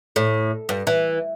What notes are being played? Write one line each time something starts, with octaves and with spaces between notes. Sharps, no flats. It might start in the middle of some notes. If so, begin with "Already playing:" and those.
A2
G2
E3